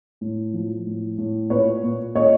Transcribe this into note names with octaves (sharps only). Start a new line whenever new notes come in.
A2
F3
A2
A2
A#2 B4 C#5
A#2
A#2 C#5 D#5